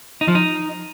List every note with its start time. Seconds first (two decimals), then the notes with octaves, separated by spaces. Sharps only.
0.21 D#4
0.28 F3
0.35 D#4